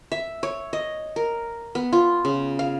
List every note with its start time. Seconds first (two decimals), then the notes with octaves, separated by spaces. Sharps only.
0.12 E5
0.43 C#5
0.73 D#5
1.16 A#4
1.75 B3
1.93 F4
2.25 C#3
2.59 F5